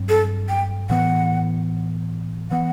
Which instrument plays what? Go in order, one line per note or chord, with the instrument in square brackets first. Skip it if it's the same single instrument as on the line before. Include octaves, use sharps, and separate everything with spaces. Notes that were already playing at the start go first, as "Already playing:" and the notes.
Already playing: [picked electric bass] G2 F#3 C4
[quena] A4
G5
[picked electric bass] A2 E3 B3 [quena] F#5
[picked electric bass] E3 B3 [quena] F#5